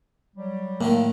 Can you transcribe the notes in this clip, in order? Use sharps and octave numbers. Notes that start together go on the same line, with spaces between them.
F#3 G3
A2 D3 D#3 A#3